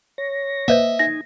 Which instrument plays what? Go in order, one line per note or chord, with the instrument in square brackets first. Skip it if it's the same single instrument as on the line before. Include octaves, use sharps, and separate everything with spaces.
[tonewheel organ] C#5 A#6
[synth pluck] A#3 B4 C5 [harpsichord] D#5 E5
[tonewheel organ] D#4 G#5 [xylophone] A#6